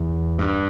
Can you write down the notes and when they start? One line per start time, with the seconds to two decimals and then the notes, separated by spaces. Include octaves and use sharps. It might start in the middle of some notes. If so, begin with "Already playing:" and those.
Already playing: E2
0.38 G2